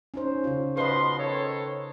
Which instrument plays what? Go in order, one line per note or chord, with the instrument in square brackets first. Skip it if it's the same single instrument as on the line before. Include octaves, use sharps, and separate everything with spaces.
[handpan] C#4 D#4 C5
C#3 F4
[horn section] B2 F3 C6 [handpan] B4 D#5
[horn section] D#3 A4 C#5